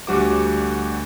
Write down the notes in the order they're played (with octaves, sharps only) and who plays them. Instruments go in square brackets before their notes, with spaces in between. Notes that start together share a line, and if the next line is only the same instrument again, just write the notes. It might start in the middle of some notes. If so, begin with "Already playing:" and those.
[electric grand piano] D2 G3 F#4 C5 D6